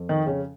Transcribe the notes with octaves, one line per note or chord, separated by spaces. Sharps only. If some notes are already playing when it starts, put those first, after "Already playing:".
Already playing: F2
D#3 D#4
C#3 C#4